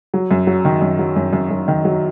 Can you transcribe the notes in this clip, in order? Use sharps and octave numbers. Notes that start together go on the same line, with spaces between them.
F#3
F#2
F#3
D#3
F#2
F#3
F#2
F#2
F#2
D#3
F#3